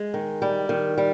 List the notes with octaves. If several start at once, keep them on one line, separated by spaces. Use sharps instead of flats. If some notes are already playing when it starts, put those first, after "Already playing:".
Already playing: G#3
D#3
G3
D#3
G3